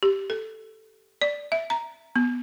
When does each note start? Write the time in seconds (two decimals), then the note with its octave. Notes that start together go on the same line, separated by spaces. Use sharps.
0.03 G4
0.30 A4
1.22 D5
1.52 E5
1.70 A#5
2.16 B3